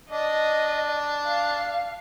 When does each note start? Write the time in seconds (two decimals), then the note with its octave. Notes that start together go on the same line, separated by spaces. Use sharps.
0.11 D4 D#5
1.27 F5